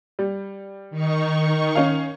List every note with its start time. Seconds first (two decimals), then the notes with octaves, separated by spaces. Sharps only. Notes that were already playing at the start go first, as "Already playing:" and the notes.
0.19 G3
0.90 D#3 D#4 C#6
1.75 C#4 F5